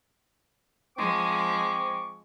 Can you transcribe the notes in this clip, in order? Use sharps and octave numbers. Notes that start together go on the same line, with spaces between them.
F3 G#3 C4 C#6 D6